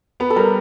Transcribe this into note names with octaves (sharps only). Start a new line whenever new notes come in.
B3 B4
A4
G3 A#4